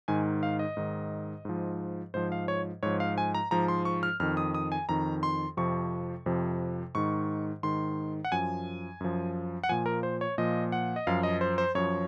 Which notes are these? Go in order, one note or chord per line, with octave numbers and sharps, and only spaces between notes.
G#2 D#3 G#5
F5
D#5
G#2 D#3
G#2 F3
G#2 F3 C5
F5
C#5
G#2 F3 C#5
F5
G#5
A#5
G#2 F3 A#5
C6
C#6
F6
F2 D#3 F6
D#6
D#6
G#5
F2 D#3 A#5
C6
F2 C3 F3 C#6
F2 C3 F3
G#2 D#3 C#6
G#2 D#3 C6
F#5
F#2 F3 G#5
F#2 F3
F#5
A#2 F3 G#5
A#4
C5
C#5
A#2 F3 D#5
F#5
D#5
F#2 F3 F5
D#5
C5
C5
F#2 F3 C#5